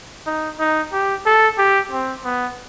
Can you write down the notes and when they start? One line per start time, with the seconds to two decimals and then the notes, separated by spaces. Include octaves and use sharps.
0.27 D#4
0.59 D#4
0.93 G4
1.26 A4
1.58 G4
1.91 C4
2.24 B3